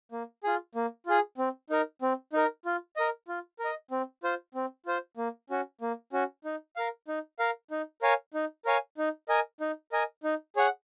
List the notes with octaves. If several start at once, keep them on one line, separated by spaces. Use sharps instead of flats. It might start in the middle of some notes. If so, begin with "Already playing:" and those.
A#3
F4 G#4
A#3
F4 G#4
C4
D#4 A#4
C4
D#4 A#4
F4
A#4 D#5
F4
A#4
D#5
C4
F4 C5
C4
F4 C5
A#3
C#4 F#4
A#3
C#4 F#4
D#4
A#4 F5
D#4
A#4 F5
D#4
A#4 C#5 F5 G#5
D#4
A#4 C#5 F5 G#5
D#4
A#4 D#5 G#5
D#4
A#4 D#5 G#5
D#4
G#4 C#5 F#5